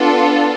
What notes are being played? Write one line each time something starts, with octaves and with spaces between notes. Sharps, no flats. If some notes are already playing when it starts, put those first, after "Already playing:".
Already playing: B3 D4 F4 A4